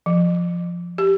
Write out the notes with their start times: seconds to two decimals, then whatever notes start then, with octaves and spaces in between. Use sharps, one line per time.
0.06 F3
0.98 G4